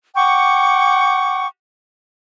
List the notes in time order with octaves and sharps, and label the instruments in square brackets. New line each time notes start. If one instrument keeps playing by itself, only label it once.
[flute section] F#5 G5 C#6 D6